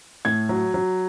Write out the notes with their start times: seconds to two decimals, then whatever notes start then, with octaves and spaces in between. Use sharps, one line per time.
0.25 A2 G#6
0.49 F#3
0.74 F#3